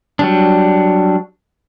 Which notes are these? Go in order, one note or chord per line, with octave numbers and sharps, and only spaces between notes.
F#3 G3 D4